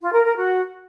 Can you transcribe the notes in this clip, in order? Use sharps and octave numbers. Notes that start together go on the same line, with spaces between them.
F4
A#4
A#4
F#4